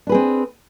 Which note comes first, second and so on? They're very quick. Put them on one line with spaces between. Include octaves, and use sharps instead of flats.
D4 B4 G#4 C4